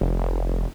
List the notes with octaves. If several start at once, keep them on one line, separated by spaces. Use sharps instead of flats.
F1